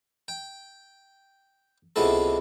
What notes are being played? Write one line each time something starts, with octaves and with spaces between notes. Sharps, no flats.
G5
C#2 C3 G#3 B3 E4 A4